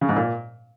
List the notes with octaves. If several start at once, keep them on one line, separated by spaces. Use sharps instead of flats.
C#3
G#2
A#2